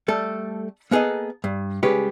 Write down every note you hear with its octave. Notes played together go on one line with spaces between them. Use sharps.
G3 A3 A4
A#3 B3 G#4 A4 D#5
G2
C#3 G3 G#3 G4 B4 C#5